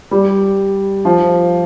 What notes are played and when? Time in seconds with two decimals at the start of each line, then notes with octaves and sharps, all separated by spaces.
0.11 G3
1.05 F3